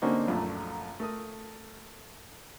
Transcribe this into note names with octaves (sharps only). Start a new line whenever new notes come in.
D3 A#3 C4 C#4 D#4 F#4
A#1 F#2 A3
A3 A#4 D#6